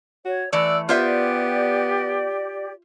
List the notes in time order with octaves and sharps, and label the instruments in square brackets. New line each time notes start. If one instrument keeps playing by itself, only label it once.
[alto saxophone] F#4 [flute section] C#5
[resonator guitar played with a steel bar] E3 A3 [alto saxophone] D5 [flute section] E6 F#6
[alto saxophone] B3 [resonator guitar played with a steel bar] F4 C5 E5 [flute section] G4 D5